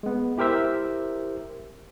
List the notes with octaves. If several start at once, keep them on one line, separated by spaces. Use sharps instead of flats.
G#3 B3
E4 G4 A#4 C5 E5